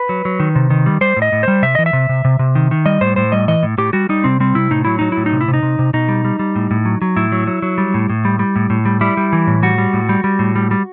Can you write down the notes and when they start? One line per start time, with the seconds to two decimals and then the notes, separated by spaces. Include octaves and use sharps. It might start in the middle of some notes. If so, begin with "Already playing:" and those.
Already playing: B4
0.09 F#3
0.25 F#3
0.40 D#3
0.55 C3
0.70 D#3
0.86 G3
1.01 G3 C5
1.16 A2
1.22 D#5
1.32 A2
1.43 G3 C5
1.62 C3 E5
1.75 E3 D#5
1.86 E5
1.93 C3
2.09 C3
2.25 C3
2.39 C3
2.55 D#3
2.71 D#3
2.86 G3 D#5
3.01 A2 C5
3.16 A2 C5
3.32 G3 D#5
3.48 E3 D#5
3.63 A2
3.78 A2 G4
3.93 G3 F#4
4.09 G3 D#4
4.24 C3 C4
4.40 G3 C4
4.55 C3 E4
4.71 A2 D#4
4.85 F#3 E4
4.99 F#3 D#4
5.12 E4
5.17 A2
5.26 D#4
5.32 C3
5.41 E4
5.48 C3
5.54 D#4
5.63 C3
5.79 C3
5.94 B2 D#4
6.08 G3
6.25 G3
6.39 G3
6.56 A2
6.71 A2
6.85 F#3
7.02 F#3
7.16 A2 E4
7.32 F#3
7.47 F#3
7.62 F#3
7.78 G3
7.94 A2
8.10 A2
8.25 G3
8.39 G3
8.56 A2
8.70 A2
8.85 G3
9.01 G3 E4
9.17 G3
9.33 E3
9.47 A2
9.63 G3 F#4
9.78 G3
9.93 A2
10.09 G3
10.24 G3
10.39 A2
10.56 G3
10.71 G3